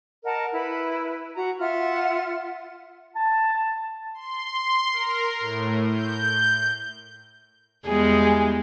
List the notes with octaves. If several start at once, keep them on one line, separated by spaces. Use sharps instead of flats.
A#4 D#5 F#5 A5
E4 B4
F#4 A#5
F4 E5 F#5 F6
A5
C6
A#4
A2
G6
E2 G3 G#3 G#4